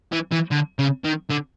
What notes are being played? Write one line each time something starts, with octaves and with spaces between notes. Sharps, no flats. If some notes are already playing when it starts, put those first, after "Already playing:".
E3
E3
D3
C#3
D#3
D3